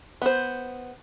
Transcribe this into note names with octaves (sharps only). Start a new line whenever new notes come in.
B3 C5